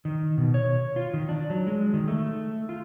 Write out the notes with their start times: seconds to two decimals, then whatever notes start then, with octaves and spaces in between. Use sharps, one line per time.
0.05 D#3
0.38 B2
0.54 C#5
0.96 F4
1.14 D#3
1.29 D4
1.50 F#3
1.67 G#3
1.94 D#3
2.08 A3
2.69 F4